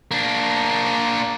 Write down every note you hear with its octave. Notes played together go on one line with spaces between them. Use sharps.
A#3 D4